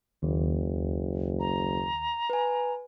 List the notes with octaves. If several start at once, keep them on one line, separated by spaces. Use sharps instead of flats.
F#1 D#2
A#5
B4 G#5